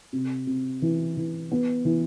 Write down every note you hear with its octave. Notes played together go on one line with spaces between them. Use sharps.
C3
C3
E3
E3
B3
E3